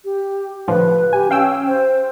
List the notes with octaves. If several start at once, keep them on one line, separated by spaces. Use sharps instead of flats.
G4
A2 D3 F3 B4
G4 G#5
C#4 F5 G5 E6
C5